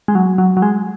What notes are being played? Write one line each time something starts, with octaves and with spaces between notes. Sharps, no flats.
G#3
F#3
F#3
F#3
G#3